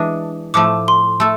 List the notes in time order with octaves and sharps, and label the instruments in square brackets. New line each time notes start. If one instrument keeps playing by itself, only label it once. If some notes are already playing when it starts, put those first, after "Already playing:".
Already playing: [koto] E3 G#3 D4
[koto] A2 F3 A3 [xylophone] D6
[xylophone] C6
[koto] A3 A4